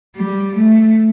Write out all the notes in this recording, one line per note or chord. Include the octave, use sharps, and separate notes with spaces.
G3
A3